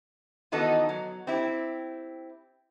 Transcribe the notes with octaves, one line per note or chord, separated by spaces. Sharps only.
D#3 E3 B3 D#4 F#4 A4
F#3
C4 E4 G4